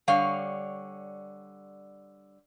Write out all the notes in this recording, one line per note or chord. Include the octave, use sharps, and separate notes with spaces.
D3 G3 C#5 F5